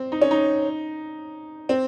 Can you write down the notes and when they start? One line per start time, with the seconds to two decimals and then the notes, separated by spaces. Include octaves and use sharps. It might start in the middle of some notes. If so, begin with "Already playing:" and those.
Already playing: C4
0.12 D#4
0.21 C#4
0.31 D#4
1.69 C4